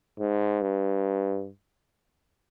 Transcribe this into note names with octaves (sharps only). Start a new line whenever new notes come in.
G#2
G2